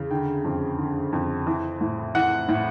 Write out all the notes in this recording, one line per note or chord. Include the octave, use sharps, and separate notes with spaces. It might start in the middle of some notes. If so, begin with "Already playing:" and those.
Already playing: E2 C#3
D3 G5
F2
D3
F2
E3
A2
E3 F#5
A2